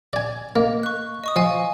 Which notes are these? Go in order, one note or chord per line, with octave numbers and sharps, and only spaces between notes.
D5 G#5
A#3 D#5
C#6 F#6
D#5 C#6 D#6
F3 D#5 F5 G#5